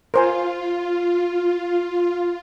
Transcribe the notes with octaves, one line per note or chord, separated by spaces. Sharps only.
F4 A#4 C5 G#5